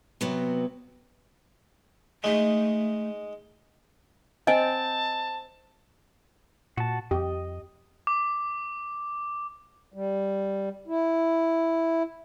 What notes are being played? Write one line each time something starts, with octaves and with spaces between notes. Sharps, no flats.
C3 F#3 B3
G#3 A3 D#4
C4 D#5 G#5 A5
A#2 F#4 A5
F2 G4 D#5
D6
G3
E4